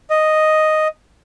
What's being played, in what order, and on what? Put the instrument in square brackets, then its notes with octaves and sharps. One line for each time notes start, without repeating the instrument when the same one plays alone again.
[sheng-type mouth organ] D#5